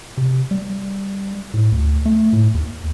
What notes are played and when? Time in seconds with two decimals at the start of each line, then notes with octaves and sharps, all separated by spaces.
0.17 C3
0.51 G3
1.54 A2
1.72 D2
2.06 A3
2.33 A2
2.54 D#2